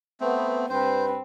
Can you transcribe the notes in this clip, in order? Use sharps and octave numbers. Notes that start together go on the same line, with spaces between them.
A3 B3 C4
G2 C4 B4 C5